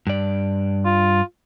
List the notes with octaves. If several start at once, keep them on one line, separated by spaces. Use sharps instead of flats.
G2 D5
F4